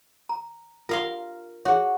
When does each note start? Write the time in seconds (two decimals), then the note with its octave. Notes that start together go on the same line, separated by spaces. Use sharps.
0.29 A#5
0.89 F4 A#4 F5 C6
1.65 F#4 G#4 C#5